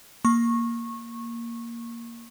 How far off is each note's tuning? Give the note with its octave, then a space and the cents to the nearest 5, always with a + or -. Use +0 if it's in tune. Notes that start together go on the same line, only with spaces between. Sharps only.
A#3 +0 C#6 -20